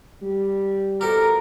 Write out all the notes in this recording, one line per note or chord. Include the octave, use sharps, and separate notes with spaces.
G3
F2 B2 G4 A4 A#4